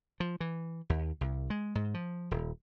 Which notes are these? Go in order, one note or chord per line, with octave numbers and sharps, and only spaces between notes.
F3
E3
D#2
C2
G#3
G#2
F3
D#1